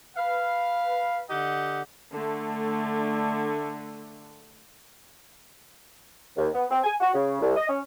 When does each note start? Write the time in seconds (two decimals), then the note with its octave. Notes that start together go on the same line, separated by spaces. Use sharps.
0.17 B4 F5
1.29 D3 G4 D#5 F#5
2.11 D3 A3
6.37 D#2
6.54 B3
6.70 C4
6.83 G#5
7.01 F#4
7.14 C#3
7.41 C2
7.57 D#5
7.69 C#4